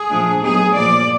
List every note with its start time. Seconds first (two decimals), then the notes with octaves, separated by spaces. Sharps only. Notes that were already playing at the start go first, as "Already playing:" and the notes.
Already playing: G#4
0.10 A#2 F3 A3 D4
0.42 F#3 B3 D#4 G#4
0.74 A#2 F3 A#3 D5